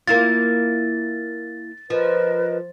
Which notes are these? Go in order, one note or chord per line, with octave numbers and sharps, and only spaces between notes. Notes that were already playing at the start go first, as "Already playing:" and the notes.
A#3 E4 F4 A6
F3 A#4 B4 D#5